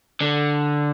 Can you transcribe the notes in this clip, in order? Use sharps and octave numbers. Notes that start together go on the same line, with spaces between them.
D3